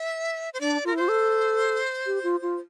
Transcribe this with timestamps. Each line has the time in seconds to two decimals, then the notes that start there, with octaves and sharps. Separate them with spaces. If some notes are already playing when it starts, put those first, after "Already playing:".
Already playing: E5
0.54 C5
0.61 D4 D5
0.84 F4 A#4
0.93 E4
0.97 F4 C5
1.09 A4
2.06 G4
2.23 F4
2.42 F4